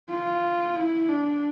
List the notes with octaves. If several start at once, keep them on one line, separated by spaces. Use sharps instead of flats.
F4
E4
D4